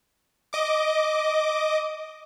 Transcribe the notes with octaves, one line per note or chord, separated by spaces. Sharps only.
D#5 D6